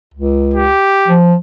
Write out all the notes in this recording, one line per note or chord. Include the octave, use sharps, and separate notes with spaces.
C#2
G4
F3